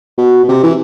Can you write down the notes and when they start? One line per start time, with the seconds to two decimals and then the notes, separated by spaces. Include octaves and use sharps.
0.18 B2
0.44 B2
0.48 C3
0.63 E3